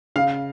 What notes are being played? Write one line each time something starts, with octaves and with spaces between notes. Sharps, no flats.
C#3 F5